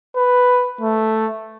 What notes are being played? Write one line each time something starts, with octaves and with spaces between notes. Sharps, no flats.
B4
A3